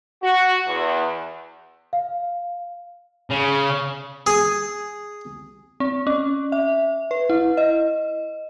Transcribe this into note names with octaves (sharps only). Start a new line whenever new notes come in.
F#4
E2
F5
C#3
G#4
C4
C#4
E5
B4
E4
D#5